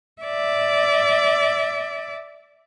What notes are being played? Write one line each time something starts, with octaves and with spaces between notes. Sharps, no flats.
D5 E5